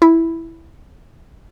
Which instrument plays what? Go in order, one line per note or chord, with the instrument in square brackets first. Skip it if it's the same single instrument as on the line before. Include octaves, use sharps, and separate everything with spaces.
[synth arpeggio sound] E4